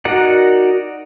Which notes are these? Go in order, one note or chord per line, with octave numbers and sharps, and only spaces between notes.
D#4 F#4 A#4 D5 F#5